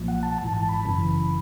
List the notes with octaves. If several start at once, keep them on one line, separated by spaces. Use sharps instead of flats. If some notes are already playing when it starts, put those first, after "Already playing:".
Already playing: B1 A#2 F3
F#5
A5
G#1 G#2 E3 A5
A5
B5
G1 F#2 C#3 E3